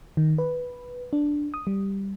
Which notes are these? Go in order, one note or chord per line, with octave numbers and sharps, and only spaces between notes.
D#3
B4
D4
D#6
G3